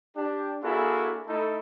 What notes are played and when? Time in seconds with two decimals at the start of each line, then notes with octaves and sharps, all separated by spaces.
0.16 D4 G4
0.63 A#3 D4 E4 F#4 G#4 A4
1.27 A3 D#4 E4 A4